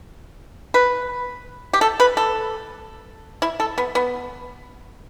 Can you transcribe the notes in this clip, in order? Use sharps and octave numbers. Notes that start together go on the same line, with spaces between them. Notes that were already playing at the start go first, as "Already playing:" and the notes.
B4
G4
A4
B4
A4
E4
A4
B3
B3